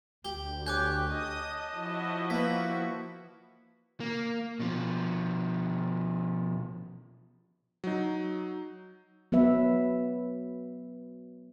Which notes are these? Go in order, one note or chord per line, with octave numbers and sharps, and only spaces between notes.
D2 G4 G7
G4 C#5 G#5 D6 F#6 G6
D#5 A5 D#6
F3 E4 F#4
A#3 B4 B6
A#3
B2 F3
F#3 D#4
F#3 B3 B4 E5